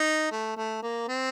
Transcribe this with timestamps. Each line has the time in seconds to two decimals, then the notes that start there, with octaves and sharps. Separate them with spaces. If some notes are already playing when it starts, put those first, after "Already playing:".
Already playing: D#4
0.31 A3
0.57 A3
0.82 A#3
1.08 C4